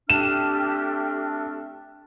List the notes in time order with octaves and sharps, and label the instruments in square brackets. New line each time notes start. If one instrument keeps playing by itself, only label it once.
[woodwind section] A3 C4 D4 [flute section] G4 A4 F6 [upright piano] E7